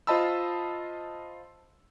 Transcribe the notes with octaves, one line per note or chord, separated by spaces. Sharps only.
F4 C5 D#5 A5 B5 E6